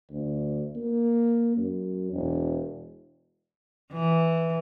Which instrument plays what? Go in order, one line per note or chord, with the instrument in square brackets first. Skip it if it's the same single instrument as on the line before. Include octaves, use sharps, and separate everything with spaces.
[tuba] D2
A#3
F#2
E1
[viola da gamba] E3